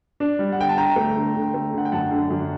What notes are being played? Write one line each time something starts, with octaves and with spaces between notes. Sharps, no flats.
D4
G3
F#5
D3 G5
A5
D3 G5 A#5
A3
D3
D3
A3
D3 F#5
G5
F#2 F#5 A5
D3
F#2